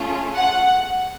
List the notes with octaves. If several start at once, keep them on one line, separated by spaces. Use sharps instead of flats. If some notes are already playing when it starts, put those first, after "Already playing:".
Already playing: A3 C#4 F4 G#4
F#5